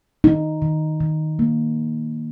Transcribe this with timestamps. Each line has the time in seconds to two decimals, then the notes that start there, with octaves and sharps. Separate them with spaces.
0.24 D#3 D#4
0.62 D#3
1.00 D#3
1.39 A#3